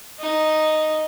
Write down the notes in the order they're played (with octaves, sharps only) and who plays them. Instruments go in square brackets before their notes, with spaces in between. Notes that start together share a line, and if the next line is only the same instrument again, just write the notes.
[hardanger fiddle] D#4